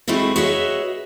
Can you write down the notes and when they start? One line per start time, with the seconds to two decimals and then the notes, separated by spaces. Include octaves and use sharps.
0.08 G#3 A3 C4 E4 F#4
0.36 F#4 G#4 B4 C#5 D#5 E5